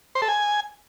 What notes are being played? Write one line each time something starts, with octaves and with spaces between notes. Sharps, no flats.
C5
A4
G#5